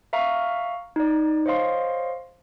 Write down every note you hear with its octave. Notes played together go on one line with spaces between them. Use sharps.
E5 F5 A#5 C#6 F6
D#4 D5
C5 C#5 D#5 F5 C6